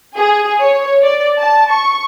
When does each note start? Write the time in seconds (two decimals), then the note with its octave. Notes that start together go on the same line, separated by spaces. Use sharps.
0.15 G#4
0.60 C#5
1.03 D5
1.39 A5
1.72 C#6